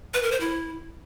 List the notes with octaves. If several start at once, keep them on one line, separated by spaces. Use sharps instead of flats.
B4
A#4
C5
E4